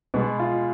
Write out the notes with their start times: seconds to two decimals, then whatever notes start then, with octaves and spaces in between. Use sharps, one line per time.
0.14 B2 G#3 B3
0.39 F4